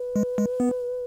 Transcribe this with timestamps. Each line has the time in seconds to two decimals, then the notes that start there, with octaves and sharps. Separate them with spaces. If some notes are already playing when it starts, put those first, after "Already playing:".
Already playing: B4
0.16 G#3
0.38 G#3
0.60 B3